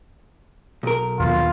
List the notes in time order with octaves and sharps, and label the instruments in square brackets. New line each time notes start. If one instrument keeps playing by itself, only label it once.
[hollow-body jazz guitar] B1 A#4
[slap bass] A#1 D#2 B3 [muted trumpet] F4